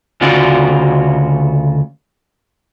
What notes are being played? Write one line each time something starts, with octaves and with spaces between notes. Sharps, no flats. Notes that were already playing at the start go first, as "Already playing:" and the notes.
D2 C#3 F4 F#4 D5